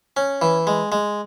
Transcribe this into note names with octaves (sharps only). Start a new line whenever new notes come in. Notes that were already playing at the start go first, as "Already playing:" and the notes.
C#4
E3
G#3
G#3